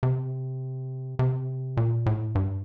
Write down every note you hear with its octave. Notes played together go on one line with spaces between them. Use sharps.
C3
C3
A#2
A2
G2